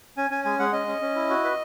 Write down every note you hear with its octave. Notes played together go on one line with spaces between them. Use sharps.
C#4 G#5
C#4 G#5
G#3 G#5
G#3 F#5
C#4 D#5
C#4
C#4
E4
F#4
B4